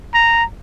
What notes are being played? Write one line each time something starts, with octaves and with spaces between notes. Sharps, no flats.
A#5